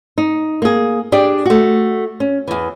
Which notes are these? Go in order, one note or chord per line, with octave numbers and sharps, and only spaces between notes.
D#4
A#3 G#4
D4 G4 G#4 D5
A3 F#4
C#4
E2 E3